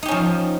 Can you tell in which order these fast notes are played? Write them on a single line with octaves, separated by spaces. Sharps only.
D#4 G4 C#4 F3